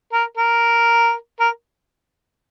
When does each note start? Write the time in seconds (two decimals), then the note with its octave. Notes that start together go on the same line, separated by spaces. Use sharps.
0.13 A#4
0.37 A#4
1.40 A#4